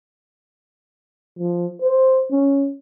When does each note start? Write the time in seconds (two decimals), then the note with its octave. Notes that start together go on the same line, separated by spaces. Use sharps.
1.39 F3
1.82 C5
2.31 C#4